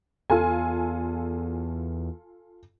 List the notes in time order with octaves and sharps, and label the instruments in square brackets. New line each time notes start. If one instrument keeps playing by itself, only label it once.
[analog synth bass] E2 [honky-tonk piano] F4 A4 G#5